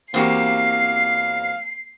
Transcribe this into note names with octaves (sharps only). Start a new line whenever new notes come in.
E2 A#3 C4 F#4 G4 F5 C7